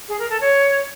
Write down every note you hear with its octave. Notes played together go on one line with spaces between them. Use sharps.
G#4
A#4
A4
C#5